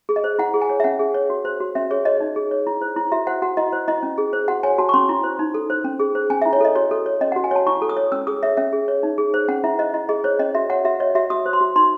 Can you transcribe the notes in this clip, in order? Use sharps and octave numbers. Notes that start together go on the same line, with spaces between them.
G#4
D#5
C5
E4 F#5
G#4
G#5
C#5
E5
C#4 F#5
G#4
C#5
F#4
C5
F#4
C#4 E5
G#4 C#5
C#5 D#5
D#4
G#4
C#5
E4
C5
E4
F#4 E5
C5 F#5
F#4 F#5
E4 D#5
C5
E4 D#5
C#4
G#4
C5
F#4 F#5
C#5 G#5
F#4 A5
C#6
C#4 C6
E4
C5
D#4
A4
C5
C#4
G#4
C5
C#4 G#5
E4 E5
C#5
A4 D#5
F#4 C#5
A4
C#5
C#4 D#5
F#4 F#5
G#5
C#5 A5
E4 C#6
A4
D#6
C#5
C#4 E6
G#4 D#6
C#5 E5
C#4 E5
G#4
C#5
D#4
G#4
C5
C#4 F#5
E4 E5
C5 D#5
E4 D#5
G#4 D#5
C5 C#5
C#4 D#5
F#4 E5
C#5 F#5
F#4 E5
C#5 D#5
F#4 E5
F#4 D#6
C5
C6
F#4
D#4 C6